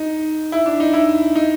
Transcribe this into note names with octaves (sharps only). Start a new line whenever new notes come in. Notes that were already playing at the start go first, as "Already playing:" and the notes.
Already playing: D#4
E4
D4
D#4
E4
D#4